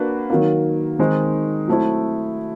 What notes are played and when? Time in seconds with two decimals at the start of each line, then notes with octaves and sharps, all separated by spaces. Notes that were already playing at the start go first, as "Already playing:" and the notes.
Already playing: A#3 D4 F#4 B4
0.30 D#3 F#3 A#3
0.99 D#3 G#3 C4 D#4
1.68 F#3 A3 C4 E4